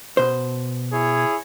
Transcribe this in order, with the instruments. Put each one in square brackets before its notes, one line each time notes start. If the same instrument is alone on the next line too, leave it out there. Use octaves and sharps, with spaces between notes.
[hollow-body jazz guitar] B2 C5
[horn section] E4 G#4 C#5